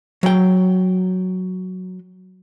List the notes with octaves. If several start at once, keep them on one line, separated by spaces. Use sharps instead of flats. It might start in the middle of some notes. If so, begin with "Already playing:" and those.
F#3 G5